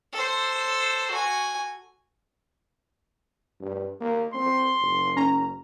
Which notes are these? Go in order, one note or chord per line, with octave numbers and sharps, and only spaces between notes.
A4 C5
F#4 G#5
G2
A#3
C4 C6
F#1
C#4 A#5